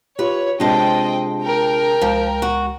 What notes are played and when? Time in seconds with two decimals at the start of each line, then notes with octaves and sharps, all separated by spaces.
0.19 F4 G4 B4 C#5
0.60 C3 G#3 C4 D4 F4 D#5 G5 A5
1.42 A#4 G5
2.01 C#2 F3 G#3
2.42 F#4